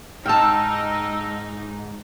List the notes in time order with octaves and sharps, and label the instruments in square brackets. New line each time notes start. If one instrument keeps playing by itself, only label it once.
[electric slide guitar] G#2 [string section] D#4 [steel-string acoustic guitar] G5 A5 [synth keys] E6 F6